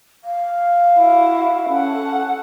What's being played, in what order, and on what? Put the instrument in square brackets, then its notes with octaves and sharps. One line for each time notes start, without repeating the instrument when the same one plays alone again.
[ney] F5
[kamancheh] E4 F#4
[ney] C#4 [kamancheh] A4 F#5